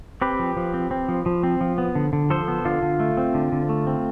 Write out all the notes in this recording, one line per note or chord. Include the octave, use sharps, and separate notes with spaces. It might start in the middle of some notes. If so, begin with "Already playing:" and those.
C4 G4 B4
F3
F3
C4
C4
F3
F3
C4
F3
B3
D3
D3
F3 A4 C5
B3
D3 F4
D3
A3
C4
D3
D3
A3
C4